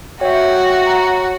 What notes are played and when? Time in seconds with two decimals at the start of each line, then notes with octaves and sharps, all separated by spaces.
0.21 F#4 C#5 E5 G5
0.86 A#5